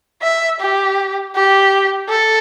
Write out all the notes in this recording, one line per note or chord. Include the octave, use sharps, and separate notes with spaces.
E5
G4
G4
A4